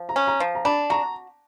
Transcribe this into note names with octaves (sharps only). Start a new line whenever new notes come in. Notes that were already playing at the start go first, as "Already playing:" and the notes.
Already playing: F3
A#5
C#4
A#5
F3
A#5
D4 B5
F#4 A#5